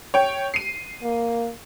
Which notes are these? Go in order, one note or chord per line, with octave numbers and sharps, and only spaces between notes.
C#5 G5
C7 D#7
A#3